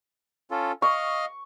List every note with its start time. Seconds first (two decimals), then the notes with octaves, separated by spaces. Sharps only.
0.51 C#4 F4 A4
0.82 D#5 F5 C#6 F6